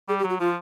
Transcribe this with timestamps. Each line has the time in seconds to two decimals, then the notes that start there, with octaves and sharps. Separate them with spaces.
0.08 G3 G#4
0.19 G4
0.24 F#3
0.30 F#4
0.40 F3 F4